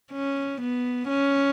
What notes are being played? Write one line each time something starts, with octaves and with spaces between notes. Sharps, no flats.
C#4
B3
C#4